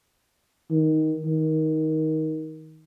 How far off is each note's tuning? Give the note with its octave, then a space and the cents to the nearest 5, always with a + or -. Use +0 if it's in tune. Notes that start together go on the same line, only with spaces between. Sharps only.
D#3 +10
D#3 +15